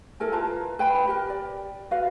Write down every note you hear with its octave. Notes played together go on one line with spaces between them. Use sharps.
E4 A4 A#4 G#5
F4 B4 A5 A#5
B4 G5 G#5 B5
G4 A#4
D5
F#4 B4 F5